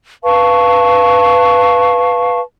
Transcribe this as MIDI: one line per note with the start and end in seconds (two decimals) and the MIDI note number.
0.24 2.40 71
0.24 2.40 77
0.24 2.40 81
0.24 2.40 85